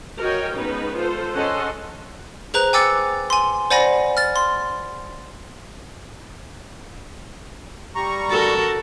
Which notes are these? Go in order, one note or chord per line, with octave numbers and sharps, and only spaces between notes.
F#4 A#4 C#5 D#5 G5
G#3 B3 C#4 D#4 B4
F4 A4 C5
C#4 G#4 A4 D#5 F#5 C6
G#4 B4 C5 A#5 F#6
G5 G#5 D6 E6 A6 C#7
G#5 C6
C5 D5 F#5 G#5 B5 A#6
F6 A6
C6
G3 A#5 C#6
F#4 A4 A#4